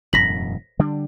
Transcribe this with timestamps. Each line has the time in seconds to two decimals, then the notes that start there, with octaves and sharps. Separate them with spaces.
0.13 E1 F#2 A2 A#6 B6 F#7
0.79 D3 G3 D4